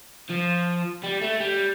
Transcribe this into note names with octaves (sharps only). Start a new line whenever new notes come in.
F3
G3
A3
G3